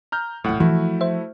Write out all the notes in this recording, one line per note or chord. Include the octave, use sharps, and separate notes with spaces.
A#5 F6 G6
B1 E2 A2 F#5
E3 F3 A3 E4 F#4
C5 E5